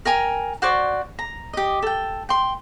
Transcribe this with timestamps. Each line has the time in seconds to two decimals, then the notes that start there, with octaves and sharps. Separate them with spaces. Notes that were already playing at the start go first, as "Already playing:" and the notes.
0.05 A#4 G5 G#5 A#5
0.62 F#4 C5 D5 C#6
1.19 A#5
1.53 G4 D#5
1.83 A4 G5
2.29 G5 C6